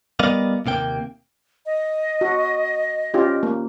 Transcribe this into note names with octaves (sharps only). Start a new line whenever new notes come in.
G3 B3 A#4 D5 D#5 F5
D#2 C3 A#3 G5
D#5
F#4
C#4 F4 G4
A#3